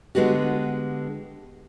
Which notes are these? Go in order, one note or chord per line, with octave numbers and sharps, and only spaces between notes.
D3 G#3 B3 F#4 G4